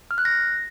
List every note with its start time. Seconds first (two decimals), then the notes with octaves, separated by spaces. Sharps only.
0.11 F6
0.18 F#6
0.25 A#6